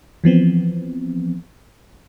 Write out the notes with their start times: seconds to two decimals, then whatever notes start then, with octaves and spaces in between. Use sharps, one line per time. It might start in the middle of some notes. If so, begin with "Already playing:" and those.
0.24 E3 F3 B3 C4